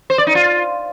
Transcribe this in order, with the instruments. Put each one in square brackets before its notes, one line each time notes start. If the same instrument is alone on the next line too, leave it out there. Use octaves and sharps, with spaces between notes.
[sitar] C5
D5
D#4
F4